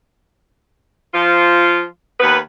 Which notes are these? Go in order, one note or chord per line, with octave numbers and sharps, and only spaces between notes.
F3 F4
D#2 B3 B4